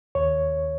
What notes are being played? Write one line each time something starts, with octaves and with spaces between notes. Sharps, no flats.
D#2 C#5